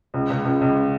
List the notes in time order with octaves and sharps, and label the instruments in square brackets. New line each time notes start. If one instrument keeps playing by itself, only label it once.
[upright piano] C#2
C#2
C#2
C#2